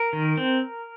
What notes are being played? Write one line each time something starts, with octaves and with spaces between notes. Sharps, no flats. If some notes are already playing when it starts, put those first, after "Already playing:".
Already playing: A#4
D#3
C4